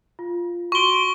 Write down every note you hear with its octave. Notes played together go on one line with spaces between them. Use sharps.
F4
F#4 C6 C#6 D7 G7